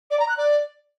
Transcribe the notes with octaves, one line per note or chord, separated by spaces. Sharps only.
D5
A#5
F#6
D5